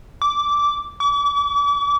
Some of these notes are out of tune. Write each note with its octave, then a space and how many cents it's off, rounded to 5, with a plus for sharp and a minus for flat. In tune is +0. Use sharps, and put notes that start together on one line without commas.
D6 -10
D6 -40